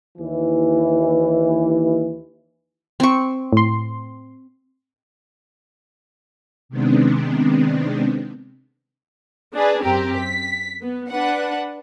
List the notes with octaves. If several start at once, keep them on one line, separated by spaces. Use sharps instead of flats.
D#2 E3
C4 C#6
A2 C6
C3 D#3 G#3 B3 C4 D4
D4 G#4 B4
F#2 C4 G4 A#4
B6
B3
D4 B4 F#5